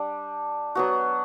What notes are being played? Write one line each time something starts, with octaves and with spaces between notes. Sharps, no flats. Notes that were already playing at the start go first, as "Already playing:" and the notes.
Already playing: G3 D4 G4
F#3 B3 F#4